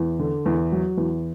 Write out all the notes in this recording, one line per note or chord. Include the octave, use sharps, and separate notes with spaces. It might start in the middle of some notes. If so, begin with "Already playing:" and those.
Already playing: E2
D3
E2
F#3
E2